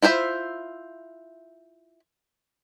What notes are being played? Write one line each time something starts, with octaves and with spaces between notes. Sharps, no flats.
E4 F4 C5 E5